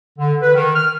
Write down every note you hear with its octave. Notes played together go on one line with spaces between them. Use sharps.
D3
B4
D#3
F6